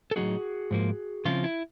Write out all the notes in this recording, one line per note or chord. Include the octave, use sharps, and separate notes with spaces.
A4
A2 F#3 A#3 D#4 F#4 G#4
G#2 F3 A#3
C#3 F3 A3 C4 E4 F4
E4